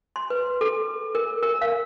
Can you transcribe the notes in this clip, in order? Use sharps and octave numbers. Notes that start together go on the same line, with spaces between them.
C6
B4
A4
A#4
A#4
F5